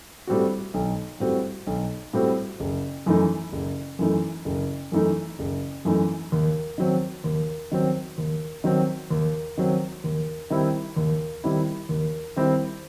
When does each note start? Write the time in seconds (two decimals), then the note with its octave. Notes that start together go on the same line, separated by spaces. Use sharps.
0.27 A2 G3 C4 F#4
0.74 B1
1.20 A2 G3 C4 F#4
1.67 B1
2.13 A2 G3 C4 F#4
2.60 F#1
3.06 F#2 E3 A3 D#4
3.53 F#1
3.99 F#2 E3 A3 D#4
4.45 F#1
4.92 F#2 E3 A3 D#4
5.39 F#1
5.85 F#2 E3 A3 D#4
6.32 D#2
6.78 D#3 F#3 C4
7.24 D#2
7.71 D#3 F#3 C4
8.18 D#2
8.64 D#3 F#3 C4
9.11 D#2
9.58 D#3 F#3 C4
10.04 D#2
10.50 D#3 G3 C4 E4
10.96 D#2
11.44 D#3 G3 C4 E4
11.89 D#2
12.36 D#3 G3 C4 E4